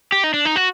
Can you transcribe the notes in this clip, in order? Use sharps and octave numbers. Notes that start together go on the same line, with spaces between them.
G4
D#4
D4
D#4
F#4